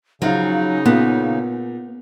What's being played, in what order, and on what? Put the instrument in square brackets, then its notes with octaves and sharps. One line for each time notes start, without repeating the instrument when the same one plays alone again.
[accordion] C#3 [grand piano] F3 F4 F5 [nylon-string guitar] F#3 [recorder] D#4
[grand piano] A#2 [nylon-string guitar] B3